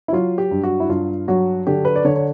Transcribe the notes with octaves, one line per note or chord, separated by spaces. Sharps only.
E4
F#3 F4
G4
G2
F#4
E4
G2 F4
F#3 F#4
D3 G4
B4
D5
D3 C#5
C#5